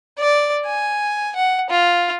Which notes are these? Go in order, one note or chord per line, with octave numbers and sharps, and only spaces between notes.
D5
G#5
F#5
F4